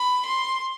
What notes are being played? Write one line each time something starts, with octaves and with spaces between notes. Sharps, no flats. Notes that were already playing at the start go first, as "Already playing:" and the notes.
Already playing: B5
C6